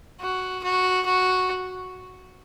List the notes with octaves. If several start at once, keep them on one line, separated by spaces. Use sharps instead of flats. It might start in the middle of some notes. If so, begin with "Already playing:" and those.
F#4
F#4
F#4